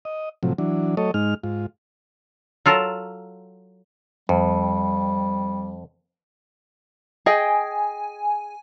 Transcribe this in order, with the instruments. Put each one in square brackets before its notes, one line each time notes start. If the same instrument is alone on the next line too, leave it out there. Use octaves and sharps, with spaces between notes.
[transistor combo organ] D#5
A2 C3 F3 F#3
E3 F#3 D4
F#3 A3 A4 C#5 D#5
G#2 G#3 D#4 F6
G#2 F4
[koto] F#3 F4 A4 A#4
[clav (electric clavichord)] F2 [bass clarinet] G3
[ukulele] G#4 D#5 G5 [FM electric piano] G#5